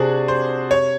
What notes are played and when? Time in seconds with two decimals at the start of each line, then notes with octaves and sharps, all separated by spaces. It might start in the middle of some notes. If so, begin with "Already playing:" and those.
Already playing: C3 D4 F#4 G#4
0.28 C5
0.71 C#5